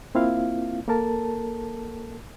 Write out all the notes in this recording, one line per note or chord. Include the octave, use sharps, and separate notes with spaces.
A#3 C4 E4 F4 F5
A#3 A4 A#4 A5